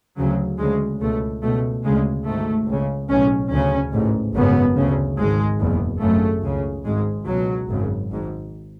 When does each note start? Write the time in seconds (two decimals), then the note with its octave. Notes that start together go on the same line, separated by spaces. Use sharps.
0.17 D2 C#3 F#3
0.59 D2 C#3 G#3
1.00 C#2 B2 A3
1.42 C#2 B2 A3
1.84 D2 C#3 G#3
2.26 G#1 G#2 A3
2.67 C#2 C#3
3.09 B1 A2 C#4
3.51 D2 C#3 C#4
3.93 A1 G#2
4.35 G#1 F#2 C#3 B3
4.76 D2 C#3
5.18 G#1 G#2 G#3
5.60 F#1 E2 B2
6.01 G#1 F#2 C#3 A3
6.43 C#2 C#3
6.85 G#1 G#2 G#3
7.26 C#2 B2 F#3
7.68 G#1 F#2 C#3
8.10 G#1 G#2